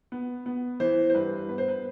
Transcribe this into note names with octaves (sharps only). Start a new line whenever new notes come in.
B3
B3
E3 C5
C5
G2 B4
B3 B4
C5
B4